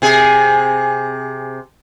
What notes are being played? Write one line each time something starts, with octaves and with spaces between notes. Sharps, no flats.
C3 G#4